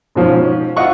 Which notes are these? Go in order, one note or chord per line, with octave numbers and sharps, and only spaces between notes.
G#2 B2 F3 C#4
E4 F4 D#5 F#5 C#6